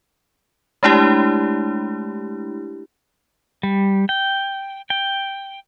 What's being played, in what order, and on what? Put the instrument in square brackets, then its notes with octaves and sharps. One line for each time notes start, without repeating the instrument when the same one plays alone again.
[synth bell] G#3 A3 D4 E4 G4
[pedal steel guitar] G3
G5
G5